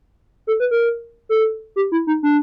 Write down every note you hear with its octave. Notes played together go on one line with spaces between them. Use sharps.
A4
B4
A#4
A4
G4
E4
D#4
D4